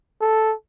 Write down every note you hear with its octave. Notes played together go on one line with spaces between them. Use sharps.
A4